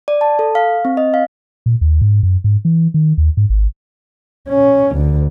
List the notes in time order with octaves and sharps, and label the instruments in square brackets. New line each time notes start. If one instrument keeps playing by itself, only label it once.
[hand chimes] D5
A5
A4
F5
C4
D#5
F5
[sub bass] A#2
D#2
G#2
F#2
G#2
E3
D#3
D#2
G#2
G#1
[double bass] C#4
D2